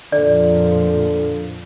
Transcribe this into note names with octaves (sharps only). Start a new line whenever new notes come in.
F2 A#2 D3 F3 D5